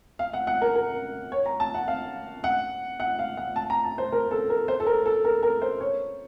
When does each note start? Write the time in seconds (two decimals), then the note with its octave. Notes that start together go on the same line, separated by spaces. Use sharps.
0.19 F5
0.33 F#5
0.47 F#5
0.61 A#4
0.76 A#4
1.32 C#5
1.46 A#5
1.60 A5
1.74 F#5
1.88 F5
2.44 F#5
3.00 F#5
3.19 F5
3.37 F#5
3.56 A5
3.70 A#5
3.84 A5
3.98 C5
4.12 A#4
4.31 A4
4.50 A#4
4.68 C5
4.80 A4
4.87 A#4
5.06 A4
5.24 A#4
5.43 A#4
5.62 C5
5.80 C#5